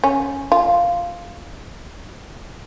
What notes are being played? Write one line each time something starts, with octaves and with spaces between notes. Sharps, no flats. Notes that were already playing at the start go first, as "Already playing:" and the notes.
C#4
F4